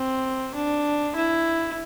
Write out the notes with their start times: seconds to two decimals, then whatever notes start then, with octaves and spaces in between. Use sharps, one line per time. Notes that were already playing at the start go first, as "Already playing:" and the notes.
Already playing: C4
0.55 D4
1.17 E4